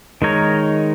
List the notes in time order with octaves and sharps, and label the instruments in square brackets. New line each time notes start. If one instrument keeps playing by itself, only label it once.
[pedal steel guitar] D#3 G#3 D#4 A#4 C#5